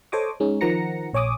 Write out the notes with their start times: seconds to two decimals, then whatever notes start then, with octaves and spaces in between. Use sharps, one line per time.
0.12 A4 C5 C#5 D#5 D6 D#6
0.40 G#3 C#4 D#4
0.61 D#3 F3 F#5 A#5 A#6 C#7
1.13 A#1 C#5 G#5 D6 D#6